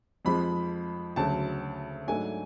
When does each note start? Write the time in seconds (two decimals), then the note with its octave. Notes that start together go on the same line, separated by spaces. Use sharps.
0.25 F2 F3 G#3 B5
1.16 D2 C#3 F#3 A5
2.07 G#2 F#3 A3 D4 G#5